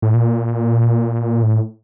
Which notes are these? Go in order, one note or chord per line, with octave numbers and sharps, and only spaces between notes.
A2
A#2
A2